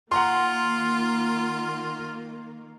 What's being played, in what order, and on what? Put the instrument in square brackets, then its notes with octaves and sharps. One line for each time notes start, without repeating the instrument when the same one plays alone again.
[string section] D#3 A#3 [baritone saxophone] F4 [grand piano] F#5 A#5 C6